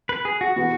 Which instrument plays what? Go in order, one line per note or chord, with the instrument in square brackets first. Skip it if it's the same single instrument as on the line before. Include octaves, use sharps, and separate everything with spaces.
[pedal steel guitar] B4
G#4
F#4
[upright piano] E3 B3 G#4 B4 [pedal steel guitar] F#4